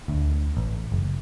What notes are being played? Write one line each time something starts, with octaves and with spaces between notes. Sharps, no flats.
D2
A1
F#1